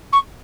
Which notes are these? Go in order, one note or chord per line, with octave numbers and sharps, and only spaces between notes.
C#6